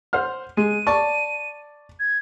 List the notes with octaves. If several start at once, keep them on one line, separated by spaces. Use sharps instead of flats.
C5 F#5 F6
G#3 D#7
D5 A5 C#6
G#6